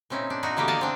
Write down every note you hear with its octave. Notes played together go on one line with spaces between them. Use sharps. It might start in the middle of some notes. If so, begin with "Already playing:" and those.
A#2 C4 C#4 D#4 E4
D4
A#2 D#4 E4 F#4
D3 E3 A#3 B3 G4
D5 D#5 F5 F#5 G#5 A5
C4 D4